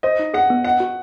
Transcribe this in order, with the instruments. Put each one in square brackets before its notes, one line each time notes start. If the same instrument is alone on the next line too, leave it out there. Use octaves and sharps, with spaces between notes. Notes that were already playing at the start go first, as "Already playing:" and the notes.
[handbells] C5 [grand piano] D#5
[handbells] D#4
[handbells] G#4 [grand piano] F#5
[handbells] B3
[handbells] D#5 [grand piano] F#5
[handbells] F#4